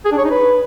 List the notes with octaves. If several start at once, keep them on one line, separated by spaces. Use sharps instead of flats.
G#4
D4
C#5
D#4
B4